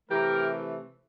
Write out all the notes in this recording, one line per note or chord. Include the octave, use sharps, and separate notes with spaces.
C3 E3 A3 G4 A#4